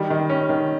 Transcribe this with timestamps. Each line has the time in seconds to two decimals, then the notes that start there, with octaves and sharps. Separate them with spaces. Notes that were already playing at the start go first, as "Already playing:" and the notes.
Already playing: D#3 G3
0.10 D#3
0.30 C#4
0.49 D#3